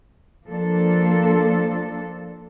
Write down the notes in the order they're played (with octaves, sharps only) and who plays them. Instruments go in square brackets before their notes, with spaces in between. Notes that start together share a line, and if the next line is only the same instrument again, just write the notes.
[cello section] F3 A#3 D4 A4